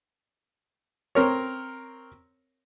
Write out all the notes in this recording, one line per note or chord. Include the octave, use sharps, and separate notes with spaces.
C4 A#4 C#5